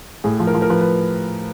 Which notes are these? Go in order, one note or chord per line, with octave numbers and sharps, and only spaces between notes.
A2 G#4
F3
A#4
F3
A#4
F3 B4
B4